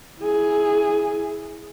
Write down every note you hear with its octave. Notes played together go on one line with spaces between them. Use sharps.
E4 G#4